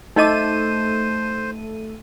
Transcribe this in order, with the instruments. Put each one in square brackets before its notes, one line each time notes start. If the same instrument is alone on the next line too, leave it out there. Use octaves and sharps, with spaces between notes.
[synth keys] A3 A4 D#7 [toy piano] D#4 D#5 D6 [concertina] C5